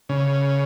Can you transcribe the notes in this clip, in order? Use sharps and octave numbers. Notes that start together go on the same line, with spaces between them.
C#3